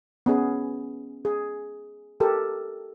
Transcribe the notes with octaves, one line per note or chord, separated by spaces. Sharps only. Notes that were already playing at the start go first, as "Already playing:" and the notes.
B3 C#4 G#4
G#4
G4 A4 A#4